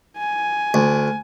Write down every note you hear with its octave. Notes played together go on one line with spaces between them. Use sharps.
G#5
D2